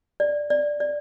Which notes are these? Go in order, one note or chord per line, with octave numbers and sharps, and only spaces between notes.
D5
D5
D5